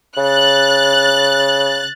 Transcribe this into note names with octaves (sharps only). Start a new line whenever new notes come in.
C#3 F#6 A6